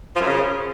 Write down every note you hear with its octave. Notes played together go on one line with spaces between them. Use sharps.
F3
F#2
C#3